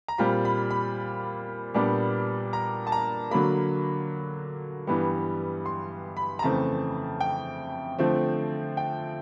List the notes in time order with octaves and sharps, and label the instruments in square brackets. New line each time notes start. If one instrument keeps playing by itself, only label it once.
[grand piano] A#5
A#2 G3 C4 F4 B5
B5
B5
A#2 G3 B3 D4
A#5
A5
A#5
D3 F#3 A#3 B5
G2 E3 G3 B3
C6
B5
A#5
F2 C#3 E3 A3 C4 A5
G5
D3 F3 A3 C4
G5